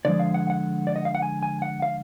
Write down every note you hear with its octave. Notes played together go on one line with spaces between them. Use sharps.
D3 F3 G#3 D5
F5
F#5
F#5
D5
D#5
F5
F#5
G#5
G#5
F#5
F5